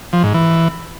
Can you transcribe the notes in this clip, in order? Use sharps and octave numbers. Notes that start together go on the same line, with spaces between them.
F3
G#2
E3